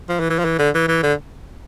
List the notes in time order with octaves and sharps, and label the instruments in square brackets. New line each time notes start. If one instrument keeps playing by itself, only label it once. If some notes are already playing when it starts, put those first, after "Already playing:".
[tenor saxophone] F3
E3
E3
F3
E3
D3
E3
E3
D3